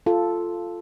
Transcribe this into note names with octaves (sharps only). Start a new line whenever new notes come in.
F4 A4